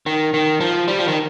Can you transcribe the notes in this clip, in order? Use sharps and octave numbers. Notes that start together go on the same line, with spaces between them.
D#3
D#3
F3
G3
F3
D#3